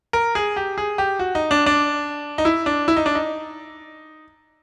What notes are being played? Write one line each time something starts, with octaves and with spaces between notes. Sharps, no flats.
A#4
G#4
G4
G#4
G4
F#4
D#4
D4
D4
D#4
E4
D4
E4
D#4
D4
D#4